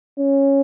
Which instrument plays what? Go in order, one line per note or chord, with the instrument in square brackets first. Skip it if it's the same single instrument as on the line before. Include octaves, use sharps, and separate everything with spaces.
[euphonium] C#4